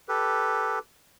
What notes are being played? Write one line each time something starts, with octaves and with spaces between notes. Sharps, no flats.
G4 A4 B4